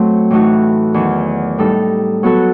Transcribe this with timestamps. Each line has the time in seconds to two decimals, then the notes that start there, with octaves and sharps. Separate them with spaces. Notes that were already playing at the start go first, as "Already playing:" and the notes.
Already playing: F#3 A3 C4
0.31 A2 E3 A3 D#4 F#4
0.94 E2 D#3 F#3
1.58 A2 G3 D#4 A4
2.23 F#3 B3 F#4 A4